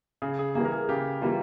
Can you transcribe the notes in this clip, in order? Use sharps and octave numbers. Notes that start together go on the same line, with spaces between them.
C#3 G#4
G#4
E3 G3 A#3 G#4
A#4
G#4
C#3 G4
E3 G3 A#3 F4